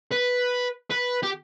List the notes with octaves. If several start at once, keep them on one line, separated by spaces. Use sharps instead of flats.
B4
B4
G4